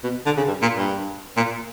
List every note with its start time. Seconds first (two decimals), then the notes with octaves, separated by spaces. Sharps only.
0.04 B2
0.26 D3
0.37 C#3
0.48 G2
0.62 A#2
0.77 G2
1.37 A#2